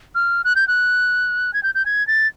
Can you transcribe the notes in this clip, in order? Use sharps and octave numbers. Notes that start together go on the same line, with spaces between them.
F6
F#6
G6
F#6
G#6
G6
G6
G#6
A6